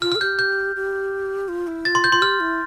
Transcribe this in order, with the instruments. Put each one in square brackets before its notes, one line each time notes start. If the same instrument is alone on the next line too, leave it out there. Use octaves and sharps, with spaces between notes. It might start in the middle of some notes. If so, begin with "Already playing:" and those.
[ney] F4 [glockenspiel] F6
[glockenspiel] F6
[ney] A4
[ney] G4 [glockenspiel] G6
[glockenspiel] G6
[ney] G4
F4
E4
[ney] F4 [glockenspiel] A6
[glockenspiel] C6
G6
[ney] F4 [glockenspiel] C6
[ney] G4 [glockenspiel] F6
[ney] E4